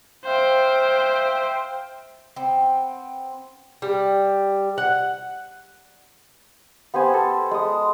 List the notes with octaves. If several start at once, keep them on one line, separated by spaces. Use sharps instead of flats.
C5 E5 F5 G5
B3 C4
G3
F#5
B3 G4 C5 G#5
A4
G#3 D#6